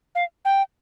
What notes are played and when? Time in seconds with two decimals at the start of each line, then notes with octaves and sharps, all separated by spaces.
0.15 F5
0.45 G5